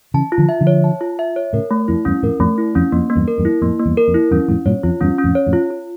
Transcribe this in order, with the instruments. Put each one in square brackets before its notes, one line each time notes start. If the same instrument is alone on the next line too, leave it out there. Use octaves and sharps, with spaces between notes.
[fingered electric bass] C#3 E3 [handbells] A5
[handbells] F4
[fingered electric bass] D3 F3
[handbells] E5
[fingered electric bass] D3 F3
[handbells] C#5
A5
F4
E5
C#5
[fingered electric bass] A2 C#3 [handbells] A#4
[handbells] A3
[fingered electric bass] F2 [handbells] E4
[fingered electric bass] E2 G2 [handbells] C#4
[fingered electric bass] F2 A2 [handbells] A#4
[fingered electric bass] F2 A2 [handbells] A3
[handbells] E4
[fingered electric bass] F2 [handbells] C#4
[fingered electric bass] F2 [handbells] A#3
[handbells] A#3
[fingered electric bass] E2 G2
[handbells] A#4
[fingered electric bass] E2 G2
[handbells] E4
[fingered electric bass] F2 A2 [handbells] A#3
[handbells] A#3
[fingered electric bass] E2 G2
[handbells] A#4
[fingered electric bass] F2
[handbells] E4
[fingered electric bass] E2 G2 [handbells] C#4
[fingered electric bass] F2 A2 [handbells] C#4
[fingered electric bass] G2 A#2 [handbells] C#5
[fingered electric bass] F2 [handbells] F4
[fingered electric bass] E2 G2 [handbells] C#4
[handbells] C#4
[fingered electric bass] F2 A2
[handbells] C#5
[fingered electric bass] F2 A2
[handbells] F4
F4